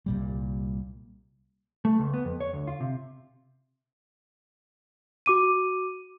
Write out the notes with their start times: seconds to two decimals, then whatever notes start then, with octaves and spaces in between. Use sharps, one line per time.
0.06 C2 A#2 G3
1.85 A3
1.99 C#2
2.14 B3
2.25 F2
2.40 C#5
2.53 D2
2.67 F4
2.80 C3
5.26 F#4 D6 D#7